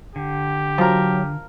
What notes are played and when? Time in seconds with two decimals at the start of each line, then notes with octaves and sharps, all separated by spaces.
0.16 D3 G4
0.78 F3 F#3 A#4